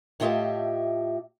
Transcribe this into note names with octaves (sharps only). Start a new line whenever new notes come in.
A2 A3 F4 G4 D#5 E5